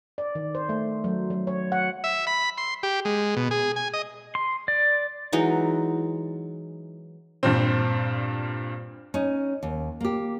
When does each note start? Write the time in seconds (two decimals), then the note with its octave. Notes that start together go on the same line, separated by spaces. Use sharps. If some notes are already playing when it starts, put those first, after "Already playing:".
0.18 D5
0.35 D#3
0.55 C5
0.69 A3
1.04 F#3
1.30 F#3
1.47 C#5
1.72 F#5
2.04 E5
2.27 B5
2.58 C6
2.83 G4
3.05 G#3
3.37 B2
3.51 G#4
3.76 G#5
3.93 D#5
4.35 C6
4.68 D5
5.33 E3 F#3 G#3 D#4
7.43 G2 A#2 C4
9.14 C#4 D#4
9.63 D#2
10.01 A#3 G4